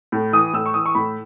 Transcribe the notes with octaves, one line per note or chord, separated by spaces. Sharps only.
A2
E3 D#6
A2 E6
C#6
E3 D#6
C#6
A2 B5